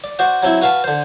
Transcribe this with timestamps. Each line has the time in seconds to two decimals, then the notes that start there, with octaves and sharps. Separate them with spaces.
0.04 D5
0.19 F#4 C5 D5 F#5
0.43 F#3 C4 E4
0.62 F#4 B4 F5 F#5 A5
0.84 D3 C5